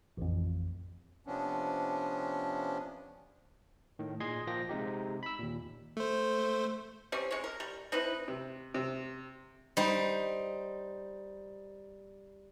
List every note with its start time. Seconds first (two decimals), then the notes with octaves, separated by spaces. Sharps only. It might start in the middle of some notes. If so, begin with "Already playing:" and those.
0.17 A1 F2
1.27 C3 F3 B3 C#4 D4
3.99 A2 D#3
4.20 A#2 G#4 D#5 C6 G#6
4.47 A#2 F3 A#3 G5 A#6
4.69 C3 G#3 D#4 G4
5.23 B5 E6
5.39 D#2 A#2
5.97 A3 C5
7.12 G3 C4 C#4
7.31 G#3 C#5
7.44 A#4
7.60 G3
7.92 C4 D#4 E4 B4
8.28 C3
8.74 C3
9.77 G3 D#4 C5